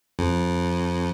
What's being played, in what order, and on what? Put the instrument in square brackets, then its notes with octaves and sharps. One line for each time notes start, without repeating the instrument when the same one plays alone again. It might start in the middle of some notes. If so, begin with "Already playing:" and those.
[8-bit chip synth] F2